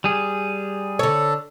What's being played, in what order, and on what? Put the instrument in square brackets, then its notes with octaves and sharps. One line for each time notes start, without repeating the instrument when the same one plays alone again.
[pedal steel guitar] G3 G#4
[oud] D3 C#5 [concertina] A4